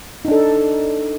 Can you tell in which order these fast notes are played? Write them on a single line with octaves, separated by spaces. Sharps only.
D#4 D4 A4